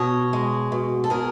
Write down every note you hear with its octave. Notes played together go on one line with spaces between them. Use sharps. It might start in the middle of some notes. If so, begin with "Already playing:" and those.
Already playing: B2 C#5 D#5
G#3
B2
A4
B2 G#4 A#4